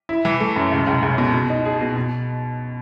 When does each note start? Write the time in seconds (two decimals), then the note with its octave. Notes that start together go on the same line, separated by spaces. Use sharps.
0.09 E4
0.25 E3
0.40 A3
0.56 F#2
0.72 C#2
0.87 C#2
1.03 C#2
1.18 B2
1.34 B2
1.50 D#4
1.65 G#4
1.81 B2
1.96 B2